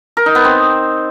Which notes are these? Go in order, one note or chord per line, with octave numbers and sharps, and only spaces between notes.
A#4
D#4
B3
C4